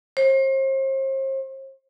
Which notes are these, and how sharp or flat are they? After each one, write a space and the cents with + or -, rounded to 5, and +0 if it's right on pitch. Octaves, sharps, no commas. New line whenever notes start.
C5 +40